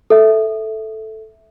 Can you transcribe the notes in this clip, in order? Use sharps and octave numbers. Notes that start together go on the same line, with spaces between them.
A4 E5